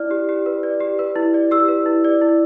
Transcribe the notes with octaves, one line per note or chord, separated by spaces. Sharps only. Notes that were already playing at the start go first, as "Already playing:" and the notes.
Already playing: E4 D5 F6
G4
G4
B4
D5
G4
B4
E4
D5
G4 E6
B4
E4
D5
E4